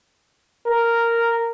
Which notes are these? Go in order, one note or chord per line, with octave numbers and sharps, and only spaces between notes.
A#4